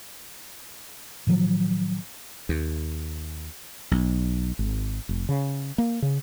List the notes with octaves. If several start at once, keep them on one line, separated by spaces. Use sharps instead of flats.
A2 D#3 F3 F#3
D#2
B1
G#1
F1
C#3
A#3
C#3